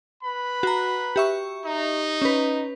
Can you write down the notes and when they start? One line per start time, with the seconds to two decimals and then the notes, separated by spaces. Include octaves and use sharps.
0.24 B4 B5
0.63 F#4 A#5
1.16 G4 E5 C#6
1.64 D#4
2.22 C#4 B4